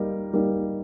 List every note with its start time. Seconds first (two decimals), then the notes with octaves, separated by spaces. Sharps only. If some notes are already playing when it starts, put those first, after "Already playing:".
Already playing: G3 A#3 D#4 A#4
0.33 G3 A#3 D#4 A#4